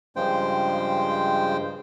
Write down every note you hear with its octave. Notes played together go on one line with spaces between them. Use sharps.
G2 C#3 F3 G#3 C5 G5